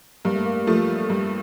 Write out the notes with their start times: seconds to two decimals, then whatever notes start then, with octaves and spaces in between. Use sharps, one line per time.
0.25 G2 A#3
0.35 A3
0.46 A#3
0.67 F3 A3
1.10 G2